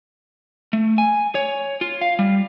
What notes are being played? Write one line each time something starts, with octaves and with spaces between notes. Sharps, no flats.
A3
G#5
C#5
F4
F5
G3